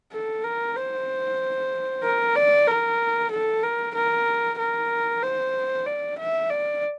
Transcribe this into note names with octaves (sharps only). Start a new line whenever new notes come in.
A4
A#4
C5
A#4
D5
A#4
A4
A#4
A#4
A#4
C5
D5
E5
D5